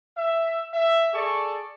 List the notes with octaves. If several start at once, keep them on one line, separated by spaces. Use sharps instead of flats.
E5
E5
G#4 A4 D5 C#6